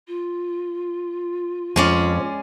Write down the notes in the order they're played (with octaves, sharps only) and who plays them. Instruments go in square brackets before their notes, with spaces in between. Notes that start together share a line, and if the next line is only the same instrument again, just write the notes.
[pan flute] F4
[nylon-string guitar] F2 [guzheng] G#3 C#4 D5